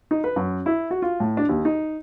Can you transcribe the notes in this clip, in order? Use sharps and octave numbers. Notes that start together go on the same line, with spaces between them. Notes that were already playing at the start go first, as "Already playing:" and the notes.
D#4
B4
F#2
E4
F#4
F4
A2
D4
D#2
D#4